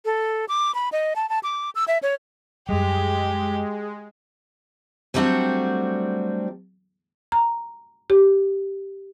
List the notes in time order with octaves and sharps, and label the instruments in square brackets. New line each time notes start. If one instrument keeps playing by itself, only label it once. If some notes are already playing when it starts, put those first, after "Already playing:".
[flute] A4
D6
B5
D#5
A5
A5
D6
E6
E5
C#5
[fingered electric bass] F#2 G3 [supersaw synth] G#3 [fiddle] G4
[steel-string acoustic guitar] F#3 G3 A3 C4 D4 F#4
[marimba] A#5
G4